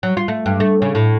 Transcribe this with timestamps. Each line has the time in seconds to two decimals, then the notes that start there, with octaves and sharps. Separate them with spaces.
0.03 F#3
0.17 F4
0.28 A3
0.46 G2
0.60 A3
0.82 C#3
0.95 A2